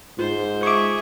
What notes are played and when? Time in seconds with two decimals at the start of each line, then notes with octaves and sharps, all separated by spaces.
0.19 G#2 F4 C5
0.63 G#4 E5 C#6 D6